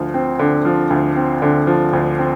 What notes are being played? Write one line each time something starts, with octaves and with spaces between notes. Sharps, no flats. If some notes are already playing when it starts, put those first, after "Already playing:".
Already playing: D2 F3
C4
D3
F3
D2
C4
D3
F3
D2
C4